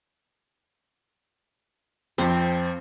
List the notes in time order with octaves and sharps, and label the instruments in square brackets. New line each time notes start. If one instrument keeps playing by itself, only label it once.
[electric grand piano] F2 F3 [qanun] C4